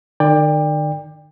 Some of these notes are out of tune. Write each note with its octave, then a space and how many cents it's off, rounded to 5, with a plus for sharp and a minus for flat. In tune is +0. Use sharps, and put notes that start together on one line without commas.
D#3 -40 D5 +10 G5 +25